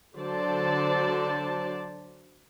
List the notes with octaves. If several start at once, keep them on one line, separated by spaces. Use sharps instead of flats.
D3 F#3 C5 D5 A5